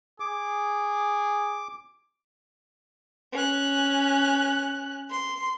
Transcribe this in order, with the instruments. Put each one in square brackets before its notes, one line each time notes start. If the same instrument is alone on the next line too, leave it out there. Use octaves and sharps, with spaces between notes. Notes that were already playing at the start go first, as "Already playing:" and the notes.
[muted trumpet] G#4 [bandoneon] D6
[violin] C#4 F#6
C6